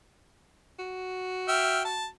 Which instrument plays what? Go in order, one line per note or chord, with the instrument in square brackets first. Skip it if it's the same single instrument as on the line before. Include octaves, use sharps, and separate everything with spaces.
[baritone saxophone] F#4
[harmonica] E5 G5 F6
A5